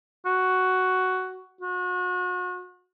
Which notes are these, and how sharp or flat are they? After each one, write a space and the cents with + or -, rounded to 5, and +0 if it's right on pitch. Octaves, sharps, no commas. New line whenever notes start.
F#4 +5
F#4 -35